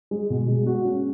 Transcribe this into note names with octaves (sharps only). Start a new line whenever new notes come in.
G#3
B2
G#3
F#4
C#4